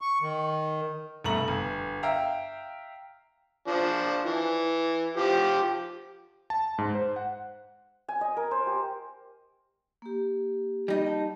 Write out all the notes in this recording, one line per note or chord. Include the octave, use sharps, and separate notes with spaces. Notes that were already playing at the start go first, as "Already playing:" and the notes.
C#6
D#3
C2 G2 B2 A3 A#5 F#7
G1
E5 F5 G5 A#5
F3 D4
E3
F3 G4
A5
G#2
C5
F#5
G#5
D#5
A#4
C5
G4
A#3 G4
G3 D#4
A5